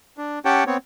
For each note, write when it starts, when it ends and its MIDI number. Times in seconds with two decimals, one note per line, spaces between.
0.18 0.39 62
0.45 0.64 61
0.45 0.64 67
0.45 0.64 73
0.45 0.64 78
0.45 0.64 79
0.45 0.64 81
0.67 0.77 59
0.67 0.77 60
0.67 0.77 73